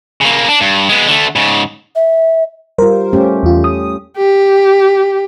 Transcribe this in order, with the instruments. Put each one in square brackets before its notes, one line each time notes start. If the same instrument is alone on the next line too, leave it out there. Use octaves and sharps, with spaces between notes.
[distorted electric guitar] C#3 A#3
D4
G2
G#3 B3
D3 A3
G#2 C#3
[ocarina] E5
[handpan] G3 F4 [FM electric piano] A#4 C5
[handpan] A3 C#4 G4
[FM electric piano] E2 F4
D#6
[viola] G4